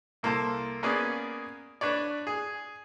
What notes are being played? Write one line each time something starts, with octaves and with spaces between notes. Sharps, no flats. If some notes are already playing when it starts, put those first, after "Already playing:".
C2 A#3 A4 C5 A5
A#3 B3 C#4 G#4 D5
D4 B4 C#5 D5
G#4